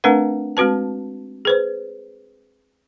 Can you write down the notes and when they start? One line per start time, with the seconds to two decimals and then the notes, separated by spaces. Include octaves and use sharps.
0.04 A3 C4 D4 A#4 B4 F#5
0.57 G#3 C4 F#4 B4 A5
1.45 G#4 B4 C5